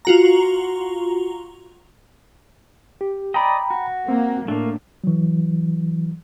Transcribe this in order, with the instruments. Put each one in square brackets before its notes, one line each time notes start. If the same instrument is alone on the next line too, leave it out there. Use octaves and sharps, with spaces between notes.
[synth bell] F4 F#4 A#5
[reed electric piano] G4
[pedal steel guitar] D5 D#5 [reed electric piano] G5 A#5 B5
[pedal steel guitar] F#4
[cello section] A#3 [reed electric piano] C4
[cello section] A2 [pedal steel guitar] A3 A#3 [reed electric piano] D4
[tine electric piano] E3 F#3